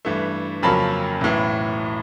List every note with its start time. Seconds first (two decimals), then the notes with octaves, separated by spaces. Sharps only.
0.05 G2 E3 A3
0.63 F2 C#3 F#3 A#3 C#4 A5 B5
1.21 B1 A2 E3